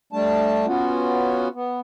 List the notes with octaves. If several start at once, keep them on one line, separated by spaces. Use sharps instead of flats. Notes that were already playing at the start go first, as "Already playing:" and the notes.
G3 A3 D4 A5
B3 C#4 F4 F#4
B3